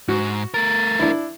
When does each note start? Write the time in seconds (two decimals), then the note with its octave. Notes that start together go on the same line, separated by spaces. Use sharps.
0.08 G#2 F#4
0.54 A3 A#4 A6
0.99 D4 E4